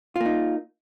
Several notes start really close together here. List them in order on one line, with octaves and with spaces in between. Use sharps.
F4 A#3 D#4